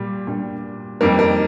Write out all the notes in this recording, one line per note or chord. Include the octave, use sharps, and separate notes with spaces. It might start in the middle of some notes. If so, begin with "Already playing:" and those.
Already playing: A#2 G3
A#2 G3 D4
F2 D#3 G3 A#3 A#4
A#4